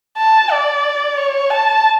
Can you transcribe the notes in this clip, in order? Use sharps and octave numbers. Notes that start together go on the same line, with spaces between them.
A5
D5
C#5
A5